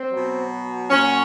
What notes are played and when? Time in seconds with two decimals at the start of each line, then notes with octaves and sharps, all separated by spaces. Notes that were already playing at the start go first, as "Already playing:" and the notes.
Already playing: C4
0.11 B2 F#3
0.90 A#2 F#3 C#4